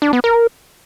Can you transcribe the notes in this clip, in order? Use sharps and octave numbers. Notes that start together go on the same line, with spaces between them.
D4
B3
A#4